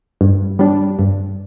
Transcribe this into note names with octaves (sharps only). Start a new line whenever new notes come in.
G2
G3 D4
G2